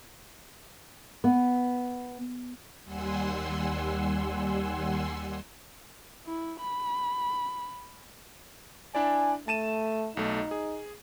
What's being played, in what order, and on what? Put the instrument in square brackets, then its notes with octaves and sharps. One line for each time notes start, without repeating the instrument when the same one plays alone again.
[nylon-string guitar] B3
[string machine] D#2 G3 F#5 G#5 C6 E6
[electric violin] E4
B5
[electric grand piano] D4 E4 D5 [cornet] G#5
[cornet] A3 [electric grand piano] A5 D#7 E7
[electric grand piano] B1 A3 [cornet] D#4
[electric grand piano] G#4